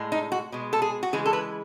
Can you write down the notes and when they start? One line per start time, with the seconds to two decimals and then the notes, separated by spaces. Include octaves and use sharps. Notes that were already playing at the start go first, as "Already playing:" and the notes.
Already playing: A2 G#3
0.12 D#4
0.32 F#4
0.52 B2 G#3
0.73 A4
0.82 G#4
1.03 F#4
1.13 C#3 E3 G#3 G#4
1.26 A4
1.33 B4